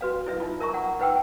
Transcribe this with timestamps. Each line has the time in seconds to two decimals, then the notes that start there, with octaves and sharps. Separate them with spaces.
0.01 F#4 B4 F5
0.26 E4 B4 E5
0.40 D#4 F4
0.60 A#4 E5 A#5 C#6
0.74 F#5
1.00 D#4 B4 F#5 G5 E6